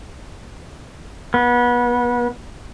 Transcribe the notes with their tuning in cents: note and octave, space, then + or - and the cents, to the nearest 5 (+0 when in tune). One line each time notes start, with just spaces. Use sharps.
B3 -25